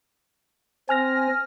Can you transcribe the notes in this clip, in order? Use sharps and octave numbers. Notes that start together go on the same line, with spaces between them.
C4 G#5 F6 A#6